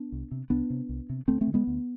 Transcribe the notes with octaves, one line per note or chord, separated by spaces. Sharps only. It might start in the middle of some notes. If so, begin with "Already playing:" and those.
Already playing: B3 D4
C2
C3
C2 B3 D4
C3
C2
C3
D2 A3 C4
A3 C4
D3
G#3 B3
D2